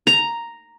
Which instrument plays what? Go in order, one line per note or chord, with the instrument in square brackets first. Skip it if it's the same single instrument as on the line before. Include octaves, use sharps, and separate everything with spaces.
[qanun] A#5